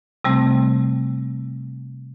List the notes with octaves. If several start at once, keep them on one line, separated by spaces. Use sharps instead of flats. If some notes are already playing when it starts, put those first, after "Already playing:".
C3 G3 A3 C4